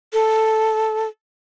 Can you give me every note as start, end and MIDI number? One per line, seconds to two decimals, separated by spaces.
0.13 1.08 69